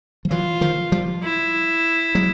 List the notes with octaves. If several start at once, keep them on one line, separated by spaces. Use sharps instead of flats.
F3
E3 F#3 F4
D#3 F3
F3 G3
E4
F#3 G#3